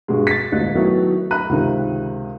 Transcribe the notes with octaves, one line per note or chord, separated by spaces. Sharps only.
G2 B2 G#3
A6 B6
E1 A1 D2 A#2 D#5 F#6
D#3 F#3 A3 B3 D#4 E4
A#5 B5 F#6 D#7
C#2 C3 D#3